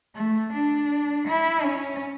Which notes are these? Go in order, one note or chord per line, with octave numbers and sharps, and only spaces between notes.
A3
D4
E4
C#4